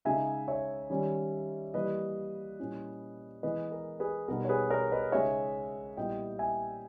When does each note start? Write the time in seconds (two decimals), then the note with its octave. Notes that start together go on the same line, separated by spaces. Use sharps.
0.05 C#3 G#3 D#4 E5 G#5
0.48 C#5 E5
0.90 D#3 G3 C#4
1.74 E3 G3 A#3 B4 D#5
2.59 A#2 G3 C#4 E4
3.43 E3 G#3 B3 E4 B4 D#5
3.72 A#4
4.00 G#4 B4
4.28 B2 G3 B3 D#4 A#4
4.45 C#5
4.49 G#4 B4
4.70 A#4 C#5
4.92 B4 D#5
5.12 C#3 G#3 D#4 C#5 E5
5.97 A#2 G3 B3 E4 D#5 G5
6.39 E5 G#5